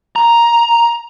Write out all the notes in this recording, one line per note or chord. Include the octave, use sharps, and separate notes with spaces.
A#5